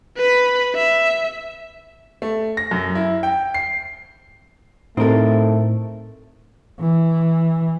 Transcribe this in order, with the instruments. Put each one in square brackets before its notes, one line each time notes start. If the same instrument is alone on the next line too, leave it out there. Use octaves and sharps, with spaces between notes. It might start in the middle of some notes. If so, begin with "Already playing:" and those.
[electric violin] B4 B5
E5
[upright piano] A3
A#6
F#2
E4
G5
C7
[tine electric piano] A2 [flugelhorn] A3 [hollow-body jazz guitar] C4 A#4 [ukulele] D#4 A4
[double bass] E3